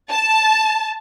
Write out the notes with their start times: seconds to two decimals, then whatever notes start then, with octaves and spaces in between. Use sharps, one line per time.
0.11 A5